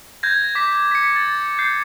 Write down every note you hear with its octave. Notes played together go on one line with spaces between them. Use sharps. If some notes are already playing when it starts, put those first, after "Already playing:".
G6 G#6 A#6
D6 B6
B6 C#7
A6
G6 C7